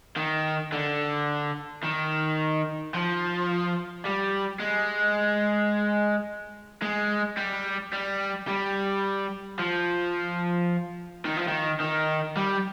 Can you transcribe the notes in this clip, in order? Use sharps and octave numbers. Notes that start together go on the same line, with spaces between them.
D#3
D3
D#3
F3
G3
G#3
G#3
G3
G3
G3
F3
D#3
F3
D#3
D#3
G3